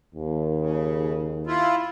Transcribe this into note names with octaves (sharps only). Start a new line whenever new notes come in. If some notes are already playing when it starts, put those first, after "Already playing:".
D#2
C#3
E4 F4